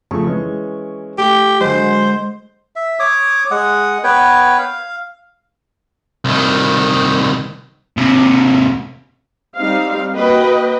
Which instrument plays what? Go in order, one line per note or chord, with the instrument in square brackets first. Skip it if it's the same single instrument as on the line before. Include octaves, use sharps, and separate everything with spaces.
[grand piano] F2 C#3 A3 [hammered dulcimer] C#6
[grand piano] E3 G#3 C#4
[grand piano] A3 [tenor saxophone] G4
[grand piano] D3 F#3 [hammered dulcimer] G#3 [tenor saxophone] C5
[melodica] E5
C#5 D6 D#6
G#3 F#5 D#6
B3 B4 C#5 G5
F5
[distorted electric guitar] C2 D#3
D#2 C3
[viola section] G3 C4 D#4 F5
A#3 F#4 B4 D#5 G5